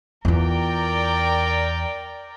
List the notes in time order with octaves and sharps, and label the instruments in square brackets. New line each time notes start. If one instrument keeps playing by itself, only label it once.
[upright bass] E2 F4 [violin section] A#4 D5 G5